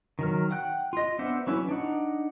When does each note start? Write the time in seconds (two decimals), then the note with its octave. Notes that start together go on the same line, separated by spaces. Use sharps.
0.19 D#3 F#3 F6
0.51 F#5 G5 F#6
0.93 F4 D#5
1.19 B3 D4 C5 E5 F#5
1.47 E3 F#3 C#4 E4 B4
1.69 D4 D#4 F#5